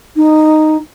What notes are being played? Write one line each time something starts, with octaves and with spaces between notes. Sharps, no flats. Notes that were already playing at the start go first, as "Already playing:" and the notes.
D#4